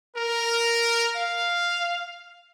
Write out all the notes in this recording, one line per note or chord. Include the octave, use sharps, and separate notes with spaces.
A#4
F5